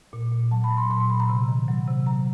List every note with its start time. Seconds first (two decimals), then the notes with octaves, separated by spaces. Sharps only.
0.13 A#2
0.32 A#2
0.51 F#3 A5
0.64 B5
0.70 F#3
0.77 C6
0.90 A#2 C6
1.00 C6
1.10 A#2 B5
1.20 A#5
1.29 C3
1.48 D#3
1.68 F#3
1.88 C3
2.06 F#3 A#5